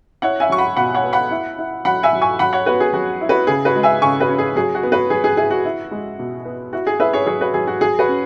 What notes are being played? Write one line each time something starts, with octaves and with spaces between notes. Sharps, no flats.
E4 C#5 F#5
E5 G#5
F#3 C#6
F#5 B5
B2 F#5 B5
C#5 F#5
B3
F#5 B5
E4
E4
F#3 F#5 B5
E5 G#5
F#3
G#5 C#6
F#3 F#5 B5
C#5 F#5
B3 F#4 B4
G#4
F#3 F#4
E4
F#4 B4
C#3 G#4
F#4 B4
G#3
E5 G#5
C#3 G#5 C#6
F#4 B4
C#4
G#4
F#3 G#4
F#4
B3
F#4 B4
F#3 G#4
G#4
E4 G#4
F#4
E4
G#3
B2
B3
E4 F#4
G#4
E4 B4 E5
G#4 C#5
F#3 G#4 C#5
F#4 B4
F#3 G#4
F#4
F#3 G#4
F#4 B4
C#4